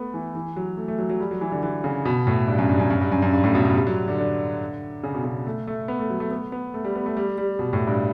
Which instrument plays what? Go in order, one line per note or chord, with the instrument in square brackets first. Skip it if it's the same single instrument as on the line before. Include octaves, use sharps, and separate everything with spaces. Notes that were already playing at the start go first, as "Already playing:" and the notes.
Already playing: [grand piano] A3 B3
E3
E3
F#3
A3
A3
F#3
F#3
G3
F#3
E3
D3
E3
C#3
B2
A2
G2
F#2
G2
F#2
F#2
G2
F#2
F#2
G2
A2
B2
B2
G3
F#3
D3
D3
C#3
B2
C#3
A3
A3
B3
A3
F#3
A3
B3
B3
A3
G3
B3
A3
G3
G3
B2
A2
G2